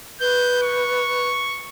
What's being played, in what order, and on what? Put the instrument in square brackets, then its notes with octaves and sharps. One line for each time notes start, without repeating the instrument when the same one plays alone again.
[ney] B4 [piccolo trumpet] G6
[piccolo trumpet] C#6